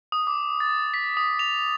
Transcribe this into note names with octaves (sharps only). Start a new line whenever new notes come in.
D#6
D6
A6
B6
D#6
F7